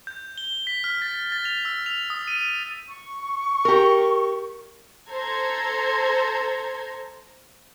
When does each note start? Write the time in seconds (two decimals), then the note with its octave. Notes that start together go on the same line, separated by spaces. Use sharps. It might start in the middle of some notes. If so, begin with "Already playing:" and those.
0.07 G6
0.38 G7
0.67 B6
0.84 F6
1.02 A6
1.32 A6
1.45 F7
1.65 E6
1.86 F7
2.10 D#6
2.28 D#7
2.41 D#7
2.87 C#6
3.65 G4 A#4
5.09 A4 C5 A#5 G#6